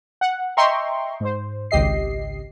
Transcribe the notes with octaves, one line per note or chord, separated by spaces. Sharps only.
F#5
D#5 E5 G5 A#5 C6 C#6
G#2 C5
G#1 C#2 G4 D#5 C7